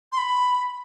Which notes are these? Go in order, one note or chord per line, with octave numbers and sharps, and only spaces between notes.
C6
B5